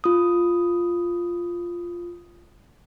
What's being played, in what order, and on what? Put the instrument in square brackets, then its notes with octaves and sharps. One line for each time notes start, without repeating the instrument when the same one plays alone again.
[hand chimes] F4 D#6